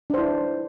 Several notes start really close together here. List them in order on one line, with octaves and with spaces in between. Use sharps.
D4 C5 E4